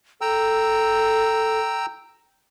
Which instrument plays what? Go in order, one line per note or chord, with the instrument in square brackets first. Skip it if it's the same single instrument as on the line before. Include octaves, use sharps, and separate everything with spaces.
[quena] A4 [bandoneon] G5 A#5 E6